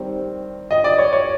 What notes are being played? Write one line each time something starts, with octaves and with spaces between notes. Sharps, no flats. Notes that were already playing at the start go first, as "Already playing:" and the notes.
Already playing: D#3 G3 C4
D#5
D5
C#5
C#5